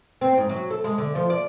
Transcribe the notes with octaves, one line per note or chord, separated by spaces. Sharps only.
C4
G#2
F#3
A4
G#3
D3
F3
D5